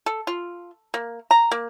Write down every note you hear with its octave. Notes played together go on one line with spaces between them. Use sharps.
A4
F4
A#3
A#5
A#3